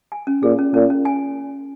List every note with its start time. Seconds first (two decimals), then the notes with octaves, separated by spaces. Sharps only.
0.12 G#5
0.27 C#4
0.43 A#2 G#4
0.59 C#4
0.74 A#2 C#4
0.90 C#4
1.05 G#5